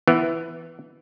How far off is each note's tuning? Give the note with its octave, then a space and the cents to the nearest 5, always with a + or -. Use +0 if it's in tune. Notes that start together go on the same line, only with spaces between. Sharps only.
E3 +0 B3 +10